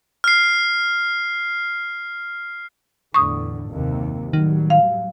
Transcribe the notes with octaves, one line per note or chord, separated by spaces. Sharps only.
F6 C7
E2 A2 D3 C#6 D#6
F#1 D#2 C3
A2 D#3 F#3 G3
F5